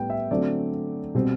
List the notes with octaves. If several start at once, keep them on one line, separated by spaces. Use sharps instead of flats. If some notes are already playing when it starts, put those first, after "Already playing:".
Already playing: A2 G3 B3 G5
E5
D3 F#3 A3 C4 D5
B2 G3 C4